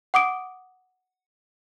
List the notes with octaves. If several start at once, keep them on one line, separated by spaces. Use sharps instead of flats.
F#5 D6 D#6 D7